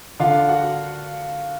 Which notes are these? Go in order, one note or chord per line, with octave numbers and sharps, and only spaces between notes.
D3 F4 F5
F#4 F#5